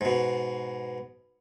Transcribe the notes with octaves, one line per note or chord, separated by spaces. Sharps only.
G#2 B2